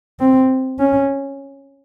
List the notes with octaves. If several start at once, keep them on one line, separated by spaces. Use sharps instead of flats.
C4
C#4